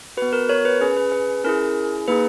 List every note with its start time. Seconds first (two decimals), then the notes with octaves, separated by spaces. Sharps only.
0.17 B3 F#4 B4
0.33 A#4
0.49 A#4 C#5
0.65 B4
0.81 C#4 G#4 B4
0.97 B4
1.12 B4
1.44 C#4 E4 G#4 A#4
2.08 A#3 D#4 G#4 B4